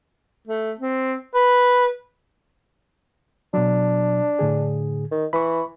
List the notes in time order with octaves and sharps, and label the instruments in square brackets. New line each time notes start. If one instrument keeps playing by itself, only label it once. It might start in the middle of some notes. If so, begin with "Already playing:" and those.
[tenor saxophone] A3
C4
B4
[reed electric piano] B2 F#3 [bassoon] D4
[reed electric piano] A2 D3 G#4
[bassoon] D#3
[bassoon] E3 [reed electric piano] B5 C#6